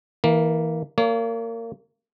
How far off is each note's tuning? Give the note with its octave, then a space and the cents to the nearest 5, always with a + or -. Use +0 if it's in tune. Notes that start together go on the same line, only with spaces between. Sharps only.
E3 -20 A#3 +0
A#3 -25 C#5 +40